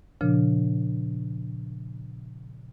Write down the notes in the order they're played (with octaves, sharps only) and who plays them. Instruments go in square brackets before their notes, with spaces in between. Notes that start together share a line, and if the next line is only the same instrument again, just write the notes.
[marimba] A#2 C#3 F3 D4